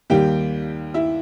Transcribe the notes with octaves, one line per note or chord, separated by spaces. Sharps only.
D#2 D#3 G3 A#3 G4 G5
E4 E5